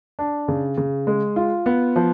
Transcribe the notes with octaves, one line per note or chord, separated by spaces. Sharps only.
D4
C#3
C#3
G#3
F4
B3
F3